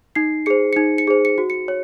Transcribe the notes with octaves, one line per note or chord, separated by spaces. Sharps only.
D#4 C7
G#4 C5 C#7
D#4 C#7
C#7
G#4 C5
C#7
F#4
C#7
C#5